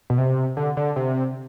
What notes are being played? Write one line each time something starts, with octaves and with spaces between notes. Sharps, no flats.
B2
C3
D3
D3
C3